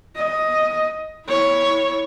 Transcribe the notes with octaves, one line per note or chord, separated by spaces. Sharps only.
D#5
E4 C#5